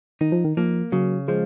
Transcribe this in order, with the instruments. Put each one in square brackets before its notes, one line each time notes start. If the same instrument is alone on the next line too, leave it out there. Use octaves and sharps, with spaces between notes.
[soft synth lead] D#3 [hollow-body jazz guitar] D#4
[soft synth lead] F3
D#3
[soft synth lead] F3 [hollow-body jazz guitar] A#3
[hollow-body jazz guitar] C#3 [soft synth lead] F#3
[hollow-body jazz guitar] F3 [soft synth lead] G#3